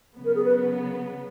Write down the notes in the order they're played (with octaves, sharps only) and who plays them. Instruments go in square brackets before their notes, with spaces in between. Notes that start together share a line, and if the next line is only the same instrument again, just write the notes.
[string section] C#3 F#3 B3
[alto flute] A#4
G#4
B4